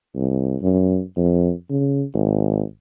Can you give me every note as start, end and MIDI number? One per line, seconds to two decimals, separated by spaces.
0.16 0.56 36
0.62 1.02 42
1.17 1.52 41
1.70 2.04 49
2.14 2.62 32